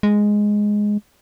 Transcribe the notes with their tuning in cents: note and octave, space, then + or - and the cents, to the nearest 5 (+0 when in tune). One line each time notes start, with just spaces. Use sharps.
G#3 +0